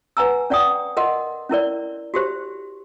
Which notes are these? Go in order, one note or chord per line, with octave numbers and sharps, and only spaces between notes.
B4 F#5 G#5 A#5 E6
C#4 D5 F#5 G5 D#6
A#4 D#5 F#5 C6
C#4 E4 A#4 D5
F#4 G4 C5